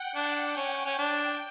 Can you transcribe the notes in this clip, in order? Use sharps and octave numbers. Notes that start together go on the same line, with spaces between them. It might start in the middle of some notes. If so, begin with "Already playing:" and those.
Already playing: F#5 G5
D4
C#4 G5
C#4
D4